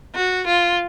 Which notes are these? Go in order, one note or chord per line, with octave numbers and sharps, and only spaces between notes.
F#4
F4